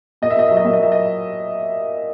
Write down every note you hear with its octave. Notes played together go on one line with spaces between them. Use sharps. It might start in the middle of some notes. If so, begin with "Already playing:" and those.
A#2 D#5
E5
A#2 D#5
F#3 E5
D#5
A#2 E5
D#5
F#3 E5
D#5